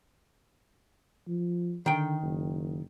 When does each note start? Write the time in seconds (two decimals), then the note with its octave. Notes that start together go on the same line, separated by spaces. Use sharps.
1.28 F3
1.86 D3 D#3 G5
2.22 F#1